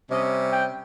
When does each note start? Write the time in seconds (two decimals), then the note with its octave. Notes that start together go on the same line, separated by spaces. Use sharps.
0.10 C3 G3 C#4 D#5
0.52 G5